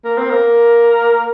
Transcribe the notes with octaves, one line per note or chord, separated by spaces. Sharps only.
A#3
C4
A#3